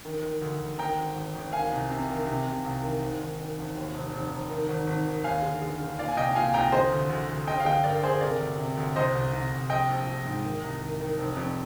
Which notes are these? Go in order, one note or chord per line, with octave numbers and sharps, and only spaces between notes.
D#3
D#3
D2
D2
D#3 G5 A#5
G#1
G#1
G#1
D#3 F5 G#5
C2
C3
D#3
C3
C3
C2
D#3
G#1
D#3
D#3
G#1
D#2
F1
F1
F1
D#3
G#1
G#1
D#3
D#2 F5 G#5
D3
D3
D3
A#2 D5 F5
G#5
C2 D#5 G5
A#2 F5 G#5
C2 G5 A#5
D3 C5 D#5
D2
D2
D2
G1 D#5 G5
F5
D3 D#5 G5
G2 A#4 D5
G2 G#4 C5
C3 A#4 D5
D2
C3
D2
C2 C5 D#5
C2
C2
C2
A#1 D#5 G5
A#1
A#1
G#2
D#3
C2
D#3
D#3
F1
F2